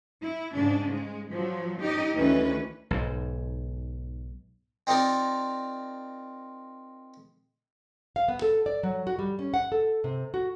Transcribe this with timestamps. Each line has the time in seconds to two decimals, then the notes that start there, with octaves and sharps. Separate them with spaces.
0.22 E4
0.56 G#2 C#3 D4
0.92 G#3
1.31 F3 F#3
1.80 D#4 G4 D#5
2.16 D2 D#3 E3 C#4 B4
2.91 B1 G#2
4.87 C4 D#4 F4 A#4 D5
8.16 F5
8.28 B3
8.42 A4
8.66 D5
8.83 F#3
9.07 F#4
9.19 G3
9.39 C#4
9.54 F#5
9.72 A4
10.04 C3
10.34 F#4